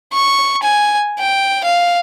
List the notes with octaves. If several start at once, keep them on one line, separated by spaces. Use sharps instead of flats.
C#6
G#5
G5
F5